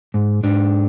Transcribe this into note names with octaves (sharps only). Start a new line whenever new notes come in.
G#2
G#2 D4